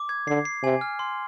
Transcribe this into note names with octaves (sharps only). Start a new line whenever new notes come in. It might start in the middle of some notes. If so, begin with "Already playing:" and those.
Already playing: D6
G#6
D3 C7
C7
C3 G#5
F6
C6